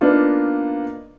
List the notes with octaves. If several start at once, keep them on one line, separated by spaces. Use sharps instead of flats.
A#3 B3 D4 D#4 F4